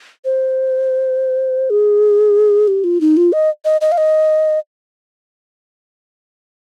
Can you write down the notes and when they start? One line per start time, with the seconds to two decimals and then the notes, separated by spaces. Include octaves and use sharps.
0.25 C5
1.70 G#4
2.68 G4
2.84 F4
3.01 D#4
3.17 F4
3.33 D#5
3.65 D#5
3.81 D#5
3.92 F5
3.98 D#5